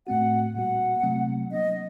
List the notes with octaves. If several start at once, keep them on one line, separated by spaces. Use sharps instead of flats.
A2 A3 C4 F#4 F#5
A#2 G3 A#3 F#4 F#5
C3 F#3 A3 C4
F#3 A#3 D4 D#5